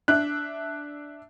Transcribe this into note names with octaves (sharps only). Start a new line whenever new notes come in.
D4 E5 F#6